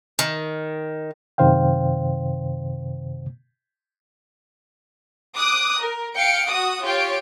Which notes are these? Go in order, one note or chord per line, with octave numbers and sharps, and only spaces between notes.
D#3
F#2 C3 D#3 C5 F5 G5
D6 D#6 F#6
A#4
F5 G5 C#7 D7
F#4 F#5 D#6
F4 G4 C#5 G5 D7